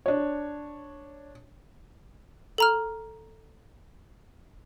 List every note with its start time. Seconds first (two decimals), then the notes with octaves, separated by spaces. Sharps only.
0.06 D4 C#5
2.58 A4 A#5 F6